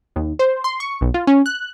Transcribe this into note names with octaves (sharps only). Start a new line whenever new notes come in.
D#2
C5
C6
C#6
B1
F4
C#4
F#6